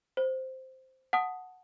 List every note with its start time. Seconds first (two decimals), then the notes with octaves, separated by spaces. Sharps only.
0.17 C5
1.13 F#5 A5 D#6